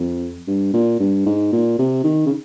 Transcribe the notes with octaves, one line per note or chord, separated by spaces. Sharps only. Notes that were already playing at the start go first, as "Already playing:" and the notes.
Already playing: F2
G2
A#2
G2
G#2
A#2
C3
D#3
C#3